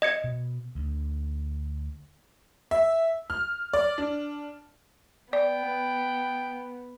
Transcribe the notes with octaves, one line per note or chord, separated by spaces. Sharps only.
D#5 G#6 C#7
B2
D2 D3
E5
F6
D5
D4
B3 D5 G5